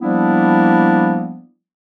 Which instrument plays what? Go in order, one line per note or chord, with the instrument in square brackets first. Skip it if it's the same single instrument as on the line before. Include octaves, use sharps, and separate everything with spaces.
[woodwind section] F3 G3 A#3 B3 D4 E4